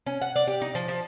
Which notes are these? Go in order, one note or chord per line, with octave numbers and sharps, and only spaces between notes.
C#4
F#5
D5
G4
D#4
F3
F3